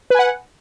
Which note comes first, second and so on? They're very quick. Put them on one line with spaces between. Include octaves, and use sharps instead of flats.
B4 G#5 F#5